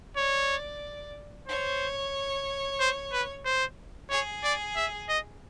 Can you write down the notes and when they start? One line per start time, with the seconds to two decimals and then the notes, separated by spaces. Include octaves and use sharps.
0.17 C#5 D5
1.48 C5 C#5
2.80 C5
3.12 B4
3.45 C5
4.10 G#4 C#5
4.44 D5
4.76 E5
5.09 D#5